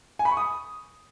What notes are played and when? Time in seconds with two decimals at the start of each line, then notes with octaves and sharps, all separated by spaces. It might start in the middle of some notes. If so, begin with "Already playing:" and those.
0.19 G#5
0.25 B5
0.31 C#6
0.37 D#6